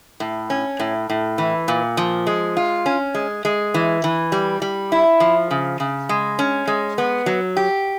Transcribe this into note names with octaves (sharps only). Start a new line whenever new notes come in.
A2
C#4
A2
A2
E3
A#2
F3
G#3
F4
C#4
G#3
G#3
E3
E3
G3
G3
E4
F3
C#3
C#3
G#3
C#4
G#3
B3
F#3
G4